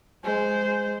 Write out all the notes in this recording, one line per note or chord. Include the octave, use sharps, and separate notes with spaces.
G#3 C5